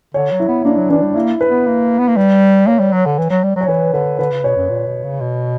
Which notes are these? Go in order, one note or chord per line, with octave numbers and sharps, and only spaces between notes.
D3 C#5
F#3
E4
B3
A#3 D4
F#3
E3 D4
G3
A#3 E4
B4
B3
A#3
B3
A#3
G3
A#3 C#5
G3
F#3
D3
E3
F#3
G3
F#3 C#5
E3 B4
D3 B4
D3 B4
C#3
B2 C#5
F#2
A#2
B2
C#3
B2